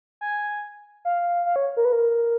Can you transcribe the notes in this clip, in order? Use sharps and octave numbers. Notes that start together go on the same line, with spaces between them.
G#5
F5
F5
C#5
A#4
B4
A#4